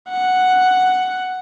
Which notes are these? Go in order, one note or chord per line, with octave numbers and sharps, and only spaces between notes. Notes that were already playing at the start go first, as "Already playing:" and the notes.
F#5